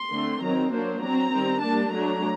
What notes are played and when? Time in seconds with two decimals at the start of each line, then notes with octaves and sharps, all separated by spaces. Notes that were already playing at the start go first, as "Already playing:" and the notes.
Already playing: C6
0.12 D3 A3 C4
0.41 D#3 F#3 C4 A#5
0.71 F#3 A#3 D4 C5
1.01 F#3 C4 A#5
1.32 D#3 G3 C4
1.61 G3 A#3 D4 A5
1.91 F#3 A3 D4 A#5